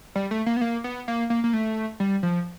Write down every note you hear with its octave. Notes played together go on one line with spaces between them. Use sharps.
G3
A3
A#3
B3
A#3
B3
A#3
A#3
A#3
A3
G3
F3